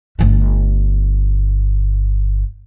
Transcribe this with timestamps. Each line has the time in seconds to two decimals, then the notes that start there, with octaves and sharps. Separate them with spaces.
0.19 G1 A3